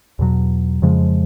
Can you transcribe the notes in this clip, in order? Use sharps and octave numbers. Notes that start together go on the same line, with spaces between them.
E2 B2 F#3
F2 C#3 F3 G#3